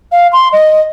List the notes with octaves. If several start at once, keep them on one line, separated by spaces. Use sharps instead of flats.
F5
C6
D#5